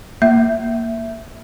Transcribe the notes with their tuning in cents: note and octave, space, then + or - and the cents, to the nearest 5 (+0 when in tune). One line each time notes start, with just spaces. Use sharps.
A#3 -5 E5 +0